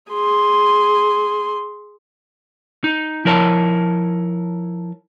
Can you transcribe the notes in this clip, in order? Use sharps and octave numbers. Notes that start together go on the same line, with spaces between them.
G#4 C6
D#4
F3 E4 A#4 C#5 A5